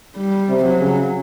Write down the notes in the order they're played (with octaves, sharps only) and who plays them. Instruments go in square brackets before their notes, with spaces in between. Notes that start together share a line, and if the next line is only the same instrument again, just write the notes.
[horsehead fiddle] G3
[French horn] C3
[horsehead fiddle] F#3
[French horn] C#3